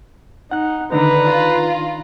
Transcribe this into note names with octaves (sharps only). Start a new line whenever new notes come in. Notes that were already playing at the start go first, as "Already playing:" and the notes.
D#4 F#5 F#6
D3 D#3 D4 D#4 B4 A#5
F4